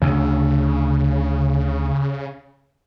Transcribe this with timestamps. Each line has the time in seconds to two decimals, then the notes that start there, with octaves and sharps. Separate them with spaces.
0.02 D2 C#3